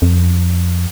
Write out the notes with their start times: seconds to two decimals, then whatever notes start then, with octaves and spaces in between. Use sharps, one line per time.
0.02 F2